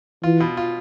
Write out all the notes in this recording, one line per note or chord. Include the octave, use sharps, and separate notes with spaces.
E3 F4
B2
F4